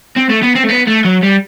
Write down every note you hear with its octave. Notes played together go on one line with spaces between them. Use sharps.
C4
A3
B3
C4
A3
B3
A3
F#3
G3